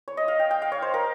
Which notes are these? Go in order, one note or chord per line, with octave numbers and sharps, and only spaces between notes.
C#5
D#5
F5
G5
G5
F5
C#5
C5
A#4